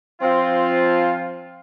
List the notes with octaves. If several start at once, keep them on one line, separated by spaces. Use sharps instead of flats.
F3 C4 F4